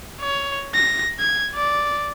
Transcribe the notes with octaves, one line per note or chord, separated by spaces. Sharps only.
C#5
A#6
G#6
D5